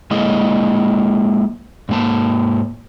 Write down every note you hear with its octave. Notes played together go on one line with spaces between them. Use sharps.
G#3 A#3 E4 G#4 D#5
G#2 A#3 A5